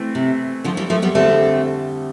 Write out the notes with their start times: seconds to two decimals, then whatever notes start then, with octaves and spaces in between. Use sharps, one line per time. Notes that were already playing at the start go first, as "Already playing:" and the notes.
Already playing: E3 A3 C4
0.15 C3
0.64 D3 F3
0.77 E3 G3
0.90 F3 A3
1.02 G3 B3
1.15 F2 D3 G3 A3 C4